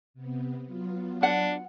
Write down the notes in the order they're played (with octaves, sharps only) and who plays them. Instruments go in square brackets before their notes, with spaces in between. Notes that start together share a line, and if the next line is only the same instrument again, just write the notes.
[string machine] C3 B3
F#3 B3 F4
[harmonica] D4 [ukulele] F#5